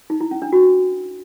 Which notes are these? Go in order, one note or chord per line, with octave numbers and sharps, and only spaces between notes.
D#4
E4
C#4
D4
F#4